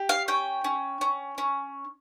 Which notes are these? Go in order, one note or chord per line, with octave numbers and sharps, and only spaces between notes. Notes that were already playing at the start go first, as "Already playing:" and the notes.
Already playing: G4
F5
C#4 G5
C#4
C#4
C#4